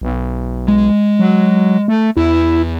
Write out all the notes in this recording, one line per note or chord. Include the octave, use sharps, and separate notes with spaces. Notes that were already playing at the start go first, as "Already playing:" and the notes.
B1
G#3
F#3
A3
E2 E4